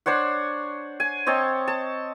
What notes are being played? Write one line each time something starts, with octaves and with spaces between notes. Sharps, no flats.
D4 C5 C#5 F#5
G#5
C4 C#5 D#5 A5
A5